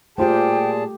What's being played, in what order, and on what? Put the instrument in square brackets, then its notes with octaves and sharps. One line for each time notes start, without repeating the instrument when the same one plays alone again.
[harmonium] A#2 G#4 A5 [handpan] A3 G4 [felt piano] F4 C5 [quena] G5